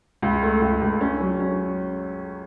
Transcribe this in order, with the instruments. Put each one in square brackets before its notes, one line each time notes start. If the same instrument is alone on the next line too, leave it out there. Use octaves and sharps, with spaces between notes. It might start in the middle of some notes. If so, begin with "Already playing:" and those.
[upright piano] C#2
A3
C#2
C#2
C#4
F#3
C#4